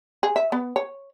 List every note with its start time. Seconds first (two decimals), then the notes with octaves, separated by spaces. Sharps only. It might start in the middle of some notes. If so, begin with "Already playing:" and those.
0.23 G#4
0.36 E5
0.52 B3
0.76 C#5